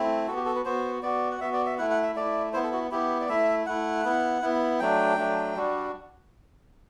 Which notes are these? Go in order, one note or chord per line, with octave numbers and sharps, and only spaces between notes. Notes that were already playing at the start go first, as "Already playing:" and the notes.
Already playing: A3 C4 E4
B3 F#4 A4
G4
A4
B4
B3 F#4 C5
B3 F#4 D5
F#5
B3 F#4 E5
D5
E5
A3 E4 F#5
F#5
E5
A3 E4 D5
B3 E4 C5
A4
F#4
B3 E4 G4
D5
A3 E4 E5
A3 E4 F#5
B3 E4
B3 E4
F#3 A3 D4 G5
F#3 A3 D4
G3 D4 F#4